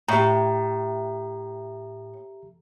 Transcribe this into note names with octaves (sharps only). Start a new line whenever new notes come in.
A2 G4 E5 A#5